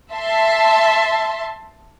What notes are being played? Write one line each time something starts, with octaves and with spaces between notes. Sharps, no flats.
E5 A5 C6